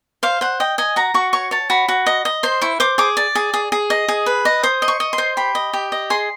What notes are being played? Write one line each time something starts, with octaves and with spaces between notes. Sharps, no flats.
C5 F5
C5 F#5
D#5 G5
D#5 G#5
F#4 A#5
F#4 C#6
C#5 C#6
C#5 A5
F#4 B5
F#4
D#5
D#5
C5 C6
E4 C#6
C5 D6
G#4 D6
D5
G#4
G#4
G#4
D#5
G#4
B4
D#5
C5 D#6
D#5
C#6
D#5
C6
C5
G4 B5
D#5
G4
D#5
G#4 C6